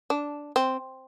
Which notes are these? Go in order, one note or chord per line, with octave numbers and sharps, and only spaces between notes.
D4
C4